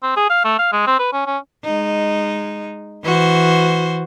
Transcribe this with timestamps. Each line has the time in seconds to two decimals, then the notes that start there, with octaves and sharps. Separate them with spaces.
0.03 C4
0.17 G#4
0.30 F5
0.45 A3
0.59 F5
0.73 G#3
0.87 C4
0.99 B4
1.13 C#4
1.26 C#4
1.65 G#3 D#4
3.03 E3 F#4 C5